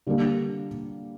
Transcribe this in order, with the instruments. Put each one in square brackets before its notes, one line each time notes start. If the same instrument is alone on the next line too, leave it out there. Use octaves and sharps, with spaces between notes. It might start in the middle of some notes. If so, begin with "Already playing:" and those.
[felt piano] D3 G3 A#3 D4